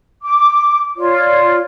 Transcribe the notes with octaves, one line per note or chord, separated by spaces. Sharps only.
D6
F4 C#5 D5